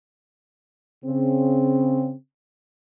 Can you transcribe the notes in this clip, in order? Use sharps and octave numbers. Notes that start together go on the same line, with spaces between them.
C#3 C4